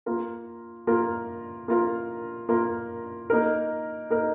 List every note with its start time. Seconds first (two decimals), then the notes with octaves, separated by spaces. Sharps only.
0.06 A#3 F4 A#4
0.87 A#3 F4 A#4
1.68 A#3 F4 A#4
2.49 A#3 F4 A#4
3.30 A#3 D#4 A#4
4.10 A#3 D#4 A#4